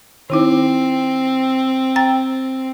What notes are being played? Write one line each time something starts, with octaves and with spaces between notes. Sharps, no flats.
D#3 C4 D#4 E4
G5 A#5 A6